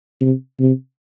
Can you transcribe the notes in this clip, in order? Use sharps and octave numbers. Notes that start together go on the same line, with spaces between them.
C3
C3